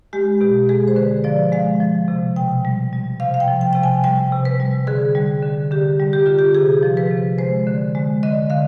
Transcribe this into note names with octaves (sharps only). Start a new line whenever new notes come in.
G#3 G4
B2 G4
G#3 G#4
C5
D3 B4
F3 D5
G#3 F5
F3
C3
B2 G5
G3
G3
C3 F5
F5
G5
F3
G5
C3 G5
G#5
G3 G5
C3
B4
G3
D3 G#4
G3
D3
D3 G4
G3
G4
D3 F4
G4
C3 G#4
F3
B4
C3
G#3 C5
D3
G#3
D3 D#5
D3 F5